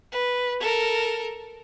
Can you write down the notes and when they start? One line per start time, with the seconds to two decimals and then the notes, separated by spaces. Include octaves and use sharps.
0.12 B4
0.60 A4 A#4